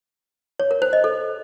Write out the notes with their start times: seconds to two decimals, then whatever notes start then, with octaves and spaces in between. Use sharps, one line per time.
0.60 C#5
0.71 A#4
0.82 C5
0.93 D#5
1.04 A4